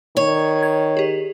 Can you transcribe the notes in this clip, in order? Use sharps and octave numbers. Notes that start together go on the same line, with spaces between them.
D#3 C#5
G#6
G4 G#4